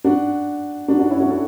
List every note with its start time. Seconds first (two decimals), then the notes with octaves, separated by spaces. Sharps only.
0.04 D4 F#4
0.88 D4 F#4
0.99 D4 F#4
1.09 C#4 E4
1.19 D4 F#4
1.30 F#4 A4